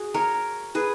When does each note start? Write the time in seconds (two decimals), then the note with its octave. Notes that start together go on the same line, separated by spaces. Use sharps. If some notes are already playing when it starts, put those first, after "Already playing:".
Already playing: F#4 G#4
0.14 A#4 C#5
0.75 G#4 B4